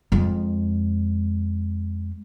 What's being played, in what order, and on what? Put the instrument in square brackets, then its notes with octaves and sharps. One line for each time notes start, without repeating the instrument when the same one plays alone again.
[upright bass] F2 G#3